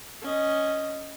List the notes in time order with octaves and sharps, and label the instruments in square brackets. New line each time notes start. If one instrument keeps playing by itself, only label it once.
[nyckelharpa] C#4 D#5